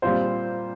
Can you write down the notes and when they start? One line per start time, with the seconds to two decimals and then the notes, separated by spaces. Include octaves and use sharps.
0.02 A#2 G3 C4 F4 C5